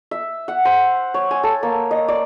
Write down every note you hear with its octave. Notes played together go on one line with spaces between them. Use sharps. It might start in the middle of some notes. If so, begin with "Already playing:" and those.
E5
F#5
C5
C#5
G#5
A4
A#3
D#5
D5